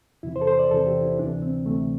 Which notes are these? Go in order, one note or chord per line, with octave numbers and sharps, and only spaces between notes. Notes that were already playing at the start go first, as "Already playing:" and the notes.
E2 C3 E3 E4
C5
A4
C5
D5
E2 C3 E3 A4
G4
E4
D2 C3 E3 D4
C4
D2 C3 E3 A3